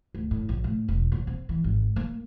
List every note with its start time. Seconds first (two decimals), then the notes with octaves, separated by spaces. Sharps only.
0.15 D2
0.31 A2
0.49 A#1
0.64 A2
0.88 E1
1.12 A#2
1.27 C4
1.49 E3
1.64 G#1
1.96 A#3